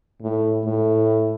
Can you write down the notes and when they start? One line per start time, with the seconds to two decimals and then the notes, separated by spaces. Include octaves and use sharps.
0.22 A2
0.65 A2